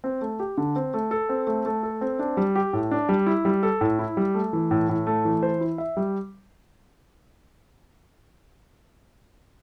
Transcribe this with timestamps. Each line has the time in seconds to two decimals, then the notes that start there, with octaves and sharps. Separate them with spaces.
0.04 C4
0.21 A3
0.40 G4
0.58 D3
0.76 C4
0.94 A3
1.11 A4
1.29 C4
1.47 A3
1.66 A3
1.83 A4
2.01 C4
2.19 D4
2.37 G3
2.55 G4
2.73 A2
2.91 D4
3.09 G3
3.27 E4
3.45 G3
3.63 A4
3.81 A2
3.99 E4
4.17 G3
4.34 A3
4.53 E3
4.71 A2
4.89 A2
5.07 A3
5.25 E3
5.43 C5
5.61 E4
5.78 E5
5.97 G3